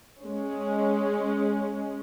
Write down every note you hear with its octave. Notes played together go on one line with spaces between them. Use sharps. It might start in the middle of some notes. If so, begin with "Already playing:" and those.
G#3 C#4